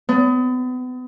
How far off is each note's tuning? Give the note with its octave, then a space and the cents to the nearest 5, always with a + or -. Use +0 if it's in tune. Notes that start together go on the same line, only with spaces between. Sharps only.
B3 +35